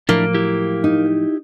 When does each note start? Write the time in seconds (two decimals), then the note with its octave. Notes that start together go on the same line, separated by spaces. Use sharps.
0.09 A2 F3 F#3 A#3 D4 E4 A#4
0.34 E4 G4
0.84 D#4